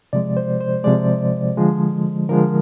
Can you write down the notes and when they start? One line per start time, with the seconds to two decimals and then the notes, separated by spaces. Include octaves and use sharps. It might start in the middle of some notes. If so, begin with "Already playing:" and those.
0.13 C3 F3 G#3 D5
0.37 C5
0.60 C5
0.84 C3 F3 G#3 D5
1.57 D3 F3 G#3
2.29 D3 F3 G#3 A#4